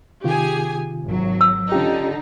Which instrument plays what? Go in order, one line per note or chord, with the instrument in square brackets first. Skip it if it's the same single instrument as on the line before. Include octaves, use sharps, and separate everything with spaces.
[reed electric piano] C3 D#3 F4 [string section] G4 G#4 G#5
[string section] G#1 F#3
[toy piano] E6
[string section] D3 D#4 [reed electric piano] C#4 F4 G4